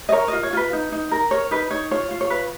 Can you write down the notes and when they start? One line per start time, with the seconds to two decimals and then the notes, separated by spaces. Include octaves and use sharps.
0.09 D#5
0.12 A#4 C#5
0.28 F4 D#5
0.43 C#5
0.53 F4 B4
0.73 D#4
0.92 D#4
1.11 A#4
1.31 A#4 C#5
1.51 D#4 B4
1.71 D#4 C#5
1.91 F4 C#5
2.11 F4
2.21 C#5
2.30 B4